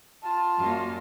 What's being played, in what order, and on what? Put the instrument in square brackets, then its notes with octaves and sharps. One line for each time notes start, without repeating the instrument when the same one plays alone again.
[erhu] F4 [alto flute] A5
[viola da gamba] F#2 [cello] G3 A#3